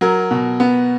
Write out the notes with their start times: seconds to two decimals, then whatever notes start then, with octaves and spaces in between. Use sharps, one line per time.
0.01 F#3 A#4
0.31 B2
0.60 B3